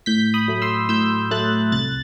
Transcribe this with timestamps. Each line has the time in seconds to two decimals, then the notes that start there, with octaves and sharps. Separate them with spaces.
0.06 A2 G6 B6
0.34 B5 D#6
0.48 F#3 A3
0.62 C6 E6
0.89 A2 E6 G6
1.31 F#3 A3 F#6 A6
1.72 C2 F#6 A6